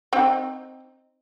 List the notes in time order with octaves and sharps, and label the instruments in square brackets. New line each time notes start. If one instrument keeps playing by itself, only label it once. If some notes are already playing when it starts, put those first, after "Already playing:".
[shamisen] C4 D#4 G5